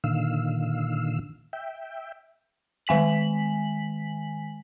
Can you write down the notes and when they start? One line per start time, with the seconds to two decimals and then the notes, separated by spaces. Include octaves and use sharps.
0.04 A#2 D3 D#3 F5 E6
1.53 E5 G5
2.87 D#3 G#3 G#5 B6 F#7